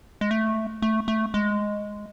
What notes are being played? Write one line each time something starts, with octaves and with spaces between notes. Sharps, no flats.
G#3
A3
A3
A3
G#3